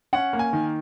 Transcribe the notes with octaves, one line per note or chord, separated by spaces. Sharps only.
C#4 F#5
A#3
G#5
D#3